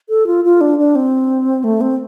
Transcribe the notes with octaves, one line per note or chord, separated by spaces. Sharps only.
A4
F4
F4
D4
D4
C4
A3
C4